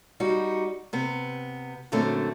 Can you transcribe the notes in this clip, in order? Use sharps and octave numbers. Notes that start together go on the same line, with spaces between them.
G3 D#4 F#4
C3 B3
F#2 A#2 D3 A3 C4